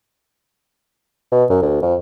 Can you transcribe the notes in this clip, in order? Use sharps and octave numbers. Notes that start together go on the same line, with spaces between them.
B2
F#2
D2
F2